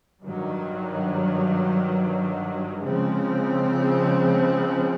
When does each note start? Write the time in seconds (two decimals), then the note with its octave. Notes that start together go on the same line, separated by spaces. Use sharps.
0.22 G2 D#3 F#3
2.84 C#3 F3 G#3 C4